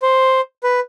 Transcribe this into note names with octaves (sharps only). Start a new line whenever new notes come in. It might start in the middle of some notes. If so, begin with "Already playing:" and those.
C5
B4